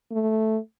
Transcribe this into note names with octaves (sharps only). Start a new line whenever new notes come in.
A3